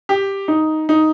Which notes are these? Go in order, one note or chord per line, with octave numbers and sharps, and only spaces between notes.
G4
D#4
D#4